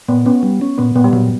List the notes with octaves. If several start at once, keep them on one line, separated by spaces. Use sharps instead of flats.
A#2 B3
B3 C#4
G3
C#4
A#2 B3
A#2 B3
G3
A#2 F#3